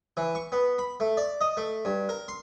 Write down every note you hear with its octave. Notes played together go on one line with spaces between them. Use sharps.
E3
C#6
B3
B5
A3
D5
D#5
A3
G2
A#4
C6